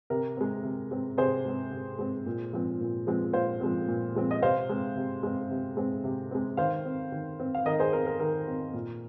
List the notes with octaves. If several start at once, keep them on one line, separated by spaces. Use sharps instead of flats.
C3 A#4
G#3 C4
C3
G#3 C4
C3 G#4 C5
G#3 C4
C3
G#3 C4
A#2
F3 G#3 C4
A#2
F3 G#3 C4
A#2 C5 F5
F3 G#3 C4
A#2
F3 G#3 C4
D#5
C3 C5 F5
G#3 C4
C3
G#3 C4
C3
G#3 C4
C3
G#3 C4
D#3 C5 F5
C4
D#3
C4
F5
D#3 A#4 D#5
G#4 C5
C4 A#4
A#4
D#3 A#4
C4
A#2